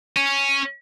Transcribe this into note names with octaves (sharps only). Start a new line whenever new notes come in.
C#4